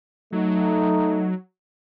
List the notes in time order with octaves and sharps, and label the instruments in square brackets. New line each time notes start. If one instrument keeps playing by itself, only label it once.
[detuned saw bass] F#3 [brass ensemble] A3 D#4